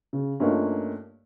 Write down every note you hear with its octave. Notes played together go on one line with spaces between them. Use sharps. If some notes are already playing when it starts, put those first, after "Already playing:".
C#3
G2 A3 A#3 C#4 D#4 F4